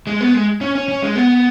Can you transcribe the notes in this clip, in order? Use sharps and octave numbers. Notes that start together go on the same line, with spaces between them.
G#3
B3
G#3
C#4
C#4
C#4
G#3
B3